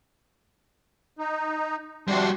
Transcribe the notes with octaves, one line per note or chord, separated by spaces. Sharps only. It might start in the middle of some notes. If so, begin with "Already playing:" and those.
D#4
C3 G3 D4 F#4 C6